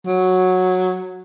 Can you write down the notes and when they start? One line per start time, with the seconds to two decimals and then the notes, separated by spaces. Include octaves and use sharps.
0.06 F#3